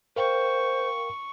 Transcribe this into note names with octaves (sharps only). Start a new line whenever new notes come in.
A#4 C5 F5 G5 C#6